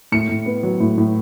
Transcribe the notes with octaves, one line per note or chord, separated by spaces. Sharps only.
A2 C#7
A2
B3
F#3
A2
A2